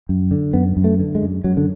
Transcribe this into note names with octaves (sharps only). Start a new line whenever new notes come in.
F#2
D3
F#2 B3
F#2
A3
D3
G#3
F#2
F#2 F#3
D3